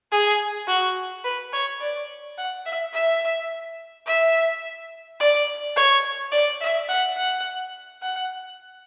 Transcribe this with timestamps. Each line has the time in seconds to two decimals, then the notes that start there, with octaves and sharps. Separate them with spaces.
0.12 G#4
0.68 F#4
1.25 B4
1.53 C#5
1.81 D5
2.38 F#5
2.66 E5
2.94 E5
4.07 E5
5.20 D5
5.76 C#5
6.32 D5
6.61 E5
6.89 F#5
7.17 F#5
8.02 F#5